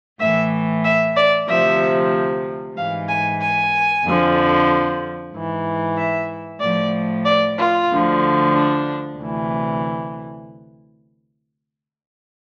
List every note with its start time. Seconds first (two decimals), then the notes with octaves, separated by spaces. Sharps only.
0.19 A2 E3 E5
0.83 E5
1.16 D5
1.47 D2 C3 F3 E5
2.76 G#2 E3 F5
3.08 G#5
3.39 G#5
4.03 F2 D3 F3
5.33 G#2 E3
5.96 E5
6.60 A2 F3 D5
7.24 D5
7.56 F4
7.89 D2 D3 F3
8.52 D4
9.17 D2 C3 E3